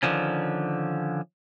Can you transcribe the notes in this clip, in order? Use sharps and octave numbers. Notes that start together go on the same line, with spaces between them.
D3 D#3 F3 C#4